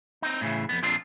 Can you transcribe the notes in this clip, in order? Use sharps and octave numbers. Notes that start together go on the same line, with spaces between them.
C4 D#4
A2 C#3 E3
F2 G#2 B3
A#2 F3 C4 D4 F4